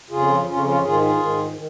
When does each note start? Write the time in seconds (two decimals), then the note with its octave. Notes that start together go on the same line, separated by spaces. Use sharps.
0.10 F2 C#3 F4 G#4
0.46 F2 C#3 C#4 F4
0.64 C#4 F4
0.83 G#2 D#3 F4 G#4
1.00 F4 G#4
1.18 G#2 D#3
1.54 D#3